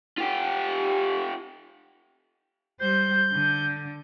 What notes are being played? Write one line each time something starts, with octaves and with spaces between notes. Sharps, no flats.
F4 G4
G3 C5 G6
D3